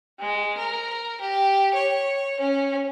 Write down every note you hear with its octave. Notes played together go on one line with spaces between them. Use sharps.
G#3
A#4
G4
C#5
C#4